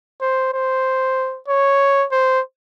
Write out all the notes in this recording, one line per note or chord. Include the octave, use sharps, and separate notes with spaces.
C5
C5
C#5
C5